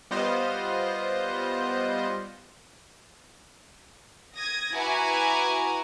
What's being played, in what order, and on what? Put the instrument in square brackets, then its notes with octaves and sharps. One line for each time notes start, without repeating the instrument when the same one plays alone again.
[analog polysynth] G3 B3 F4 C5 D#5
[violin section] D#6 G#6 A#6
E4 F#4 B4 G#5 A#5 D6